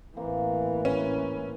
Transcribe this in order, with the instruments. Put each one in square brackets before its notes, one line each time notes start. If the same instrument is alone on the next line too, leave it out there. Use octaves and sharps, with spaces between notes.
[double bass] A1 E3 [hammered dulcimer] A#3 C4
[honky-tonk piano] C#4